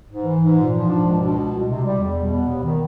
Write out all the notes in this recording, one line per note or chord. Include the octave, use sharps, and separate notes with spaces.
G#2
E3
G#2
A#2
F3
D4
C#2
B2
C#2
C2
C3
G3
E2
B2
B3
D#2
D#3